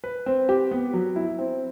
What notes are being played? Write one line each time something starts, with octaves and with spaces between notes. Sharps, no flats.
B4
C4
G4
B3
F#3
E4
C4